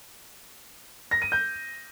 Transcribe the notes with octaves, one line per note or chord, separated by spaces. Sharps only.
A#6
D#7
G6